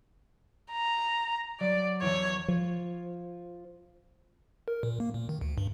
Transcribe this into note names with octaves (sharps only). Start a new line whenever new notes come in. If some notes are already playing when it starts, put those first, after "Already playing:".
A#5
F#3 D5 D6
E2 E3 C#5
F3
A#4
A#2
A#3
A#2
D#3
D2
G2